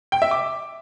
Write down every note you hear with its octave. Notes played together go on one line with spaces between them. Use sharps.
G5
E5
D6